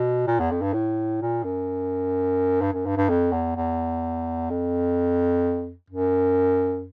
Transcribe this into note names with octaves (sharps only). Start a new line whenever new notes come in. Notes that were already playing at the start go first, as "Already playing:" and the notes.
Already playing: B2
A#2
E2
F2
G2
A2
A#2
F#2
G2
F#2
G2
G2
F2
E2
E2
F2
F#2